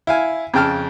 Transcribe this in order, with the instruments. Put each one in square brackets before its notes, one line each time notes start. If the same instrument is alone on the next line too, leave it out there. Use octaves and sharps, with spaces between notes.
[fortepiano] E4 F5 G#5
F2 C#3 G5 A5 F6